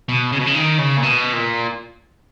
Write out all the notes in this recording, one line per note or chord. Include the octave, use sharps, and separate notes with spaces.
B2
C#3
B2
C#3
D#3
C#3
A#2
B2
A#2